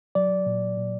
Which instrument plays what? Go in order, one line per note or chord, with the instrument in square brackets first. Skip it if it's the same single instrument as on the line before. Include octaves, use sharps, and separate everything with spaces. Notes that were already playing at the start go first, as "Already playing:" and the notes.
[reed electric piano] F#3 D5
A#2
A#2